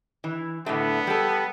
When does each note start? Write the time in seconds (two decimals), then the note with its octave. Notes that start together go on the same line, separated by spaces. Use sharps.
0.24 E3
0.66 A2 D3 A3 B3
1.07 G3 A4